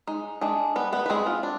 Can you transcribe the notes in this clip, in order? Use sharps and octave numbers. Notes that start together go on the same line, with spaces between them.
G#3 D#4
G#3 D4 G#4
G3 B3 B4
B3 B4
B4
G#3 C4 G#4
F4
D4